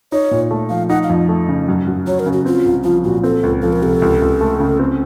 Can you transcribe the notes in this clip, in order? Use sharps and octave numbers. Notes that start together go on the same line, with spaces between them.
D#4 C#5
A#2
A3
F3 F5
D#4 F#5
F5
F2
A3
C#3
F#2
F#2
F#3 C#5
A#4
C#3
F#4
C4 F4
C2
F3 F4
A#2 F#4
C4 A4
C#2
F3 A4
A#4
C3 A4
C#2
C#2
A3
C#3
C4